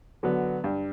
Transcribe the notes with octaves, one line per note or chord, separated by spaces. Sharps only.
D3 F#3 B3
G2